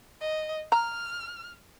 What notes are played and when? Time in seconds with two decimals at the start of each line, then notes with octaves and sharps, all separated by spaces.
0.20 D#5
0.72 A#5 F6